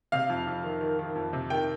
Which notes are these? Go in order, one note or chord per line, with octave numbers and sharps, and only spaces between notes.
C3 F5
F2
F2
D#3
D#3
D#3
F2
C3
D#3 G5